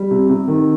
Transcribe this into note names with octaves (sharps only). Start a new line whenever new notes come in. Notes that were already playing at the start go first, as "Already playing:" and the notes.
Already playing: G3
C3
C3
D#3